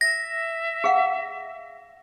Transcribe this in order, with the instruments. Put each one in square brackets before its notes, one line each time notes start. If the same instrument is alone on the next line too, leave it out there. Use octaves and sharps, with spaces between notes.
[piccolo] E5 [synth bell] A#6
[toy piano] G#4 F5 F#5